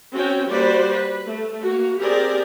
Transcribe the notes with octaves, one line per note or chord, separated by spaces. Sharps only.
C4 C#4 F#4 G5
G3 A#3 F#4 B4 C5 D5
B4
A3
A#3 F#4
C4 G4 G#4 A#4 D5